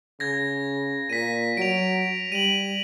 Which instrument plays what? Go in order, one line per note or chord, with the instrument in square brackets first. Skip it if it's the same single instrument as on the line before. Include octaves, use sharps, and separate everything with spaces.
[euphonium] C#3 [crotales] G#6 A#6
[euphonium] A#2 [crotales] B6 D#7
[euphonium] F#3 [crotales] D7 F7
[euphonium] G3 [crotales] D#7 F#7